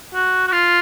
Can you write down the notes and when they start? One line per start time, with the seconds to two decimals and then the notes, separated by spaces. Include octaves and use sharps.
0.14 F#4
0.47 F#4
0.52 F4